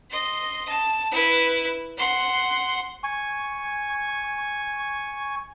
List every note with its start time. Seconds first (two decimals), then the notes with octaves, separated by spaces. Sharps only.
0.10 D#5 C6
0.69 A5
1.11 E4 B4
1.97 F#5 C6
3.03 G#5 C#6